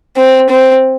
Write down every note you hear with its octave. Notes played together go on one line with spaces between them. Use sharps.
C4
C4